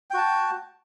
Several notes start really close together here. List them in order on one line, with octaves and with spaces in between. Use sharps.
G5 F#4 A5